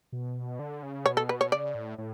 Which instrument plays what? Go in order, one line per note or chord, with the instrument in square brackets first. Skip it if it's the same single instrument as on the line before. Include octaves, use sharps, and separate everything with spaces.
[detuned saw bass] B2
D3
C#3
[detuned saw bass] B2 [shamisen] C#5
[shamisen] A4
B4
C#5
[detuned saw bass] C#3 [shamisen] D5
[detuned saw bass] A2
A2